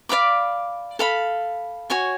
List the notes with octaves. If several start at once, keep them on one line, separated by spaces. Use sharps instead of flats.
D5 F5 B5 D6
A4 F5 B5
F#4 C#5 G#5 C#6